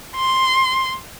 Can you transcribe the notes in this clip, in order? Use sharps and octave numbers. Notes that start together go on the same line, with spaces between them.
C6